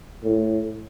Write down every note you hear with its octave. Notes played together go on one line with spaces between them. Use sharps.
A2